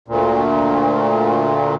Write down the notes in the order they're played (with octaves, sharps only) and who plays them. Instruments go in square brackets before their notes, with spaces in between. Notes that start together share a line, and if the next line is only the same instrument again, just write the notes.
[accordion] D2 A#2